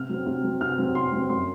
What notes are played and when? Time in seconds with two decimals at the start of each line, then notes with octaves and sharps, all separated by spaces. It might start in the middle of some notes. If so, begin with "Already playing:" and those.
Already playing: C3 F6
0.09 F#3 C4
0.26 C3
0.43 F#3 C4
0.61 C3 F6
0.78 F#3 C4
0.95 C3 C6
1.12 F#3 C4
1.29 F#2 C6